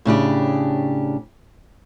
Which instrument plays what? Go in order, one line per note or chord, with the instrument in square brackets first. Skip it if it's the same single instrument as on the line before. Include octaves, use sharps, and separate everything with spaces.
[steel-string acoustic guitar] A2 C#3 D4 G4